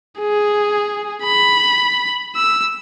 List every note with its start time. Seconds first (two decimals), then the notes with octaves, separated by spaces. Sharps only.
0.20 G#4
1.23 B5
2.36 E6